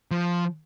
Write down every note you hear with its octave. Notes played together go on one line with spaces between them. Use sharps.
F3